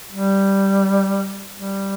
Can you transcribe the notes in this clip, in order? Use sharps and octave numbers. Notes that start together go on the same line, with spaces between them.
G3
G3